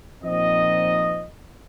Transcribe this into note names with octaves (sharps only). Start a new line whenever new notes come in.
A#2 F3 C4 D#4 D#5